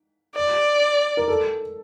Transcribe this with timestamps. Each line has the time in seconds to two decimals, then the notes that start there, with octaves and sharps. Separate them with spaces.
0.35 D5
1.17 A#4
1.28 A4